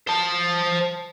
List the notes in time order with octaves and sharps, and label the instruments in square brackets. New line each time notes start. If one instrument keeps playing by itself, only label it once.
[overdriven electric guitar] C5 A5